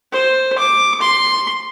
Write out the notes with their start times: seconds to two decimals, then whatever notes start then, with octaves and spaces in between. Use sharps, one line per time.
0.12 C5
0.58 D6
1.01 C6